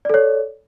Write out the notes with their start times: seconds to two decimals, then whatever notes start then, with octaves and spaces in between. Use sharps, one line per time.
0.05 D5
0.09 A4
0.14 C#5